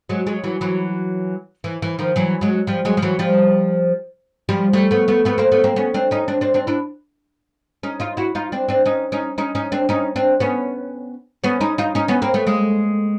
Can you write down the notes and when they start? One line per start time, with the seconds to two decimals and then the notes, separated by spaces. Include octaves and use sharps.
0.09 F#3 G#3
0.27 F#3 G#3
0.44 E3 F#3
0.61 E3 F#3
1.64 E3
1.82 E3
1.99 D#3 F3
2.16 E3 F#3
2.41 F#3 G#3
2.67 F3 G3
2.85 F#3 G#3
2.97 F3
3.02 E3 F#3
3.19 F3 G3
4.49 F3 G3
4.73 G3 A3
4.91 A3 B3
5.08 A3 B3
5.25 A3 B3
5.38 A#3 C4
5.52 A3 B3
5.64 A#3 C4
5.76 B3 C#4
5.94 C4 D4
6.11 C#4 D#4
6.28 C4 D4
6.41 C4 D4
6.54 C4 D4
6.67 D4 E4
7.83 C#4 D#4
8.00 D#4 F4
8.17 E4 F#4
8.35 D#4 F4
8.52 C4 D4
8.69 C4 D4
8.86 C#4 D#4
9.12 C#4 D#4
9.38 C#4 D#4
9.55 C#4 D#4
9.72 C4 D4
9.89 C#4 D#4
10.16 C4 D4
10.40 B3 C#4
11.44 B3 C#4
11.61 C#4 D#4
11.78 D#4 F4
11.95 C#4 D#4
12.08 B3 C#4
12.22 A#3 C4
12.34 A3 B3
12.47 G#3 A#3